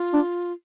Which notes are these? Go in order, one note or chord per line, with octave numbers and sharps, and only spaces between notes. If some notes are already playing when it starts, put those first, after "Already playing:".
Already playing: F4
D4